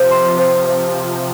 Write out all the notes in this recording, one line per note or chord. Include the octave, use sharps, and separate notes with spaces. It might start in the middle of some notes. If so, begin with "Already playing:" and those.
Already playing: C3 F3 C5
C6
C5
C5
C5